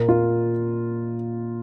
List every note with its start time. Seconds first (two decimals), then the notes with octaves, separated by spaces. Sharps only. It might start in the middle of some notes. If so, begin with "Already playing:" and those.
Already playing: A#2 A#3 A#4
0.09 F4